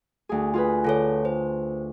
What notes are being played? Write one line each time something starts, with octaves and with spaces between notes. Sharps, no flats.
D2 G#4
F4 G#4 B4
D3 F4 A4 C#5
C5